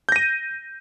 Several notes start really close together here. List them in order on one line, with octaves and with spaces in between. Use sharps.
G6 A#6 D#7